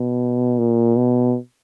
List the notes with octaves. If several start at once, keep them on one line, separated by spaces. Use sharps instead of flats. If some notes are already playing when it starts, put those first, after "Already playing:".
Already playing: B2
A#2
B2